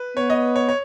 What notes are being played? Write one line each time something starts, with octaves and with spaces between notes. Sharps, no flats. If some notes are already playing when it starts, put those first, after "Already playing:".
Already playing: B4
B3 C#5
D#5
C#5
C#5